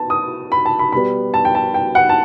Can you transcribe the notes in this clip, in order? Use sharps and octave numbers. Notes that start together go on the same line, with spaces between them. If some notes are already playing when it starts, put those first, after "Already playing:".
Already playing: B3 A5
D#6
B5
A5
B5
B2 G3 B3 B5
A5
G5
A5
G5
F#5
A5